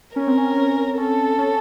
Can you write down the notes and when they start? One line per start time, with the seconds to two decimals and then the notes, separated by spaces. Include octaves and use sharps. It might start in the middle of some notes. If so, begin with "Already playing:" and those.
0.16 C#4 A#4
0.27 C4
0.38 C#4
0.57 C#4
0.98 C#4 A4
1.38 C#4